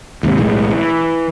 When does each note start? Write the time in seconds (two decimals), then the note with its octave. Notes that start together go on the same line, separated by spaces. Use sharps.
0.23 D#2 G#2 C3
0.37 B1 A2 E3 G#3
0.70 E3